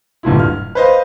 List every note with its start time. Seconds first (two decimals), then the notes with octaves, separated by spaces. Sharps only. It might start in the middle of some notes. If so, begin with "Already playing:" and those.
0.23 D1 G2 A#2 E4
0.39 F6
0.75 B4 C5 D#5 F5